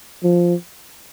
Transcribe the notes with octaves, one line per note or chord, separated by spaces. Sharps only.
F3